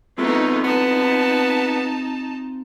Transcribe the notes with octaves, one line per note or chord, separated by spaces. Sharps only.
A3 B3 C4 D#4 F4 G#4
B3 D#4 A5